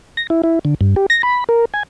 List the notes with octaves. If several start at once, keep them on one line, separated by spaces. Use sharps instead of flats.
A#6
E4
E4
D3
G2
G4
A#6
B5
A#4
G#5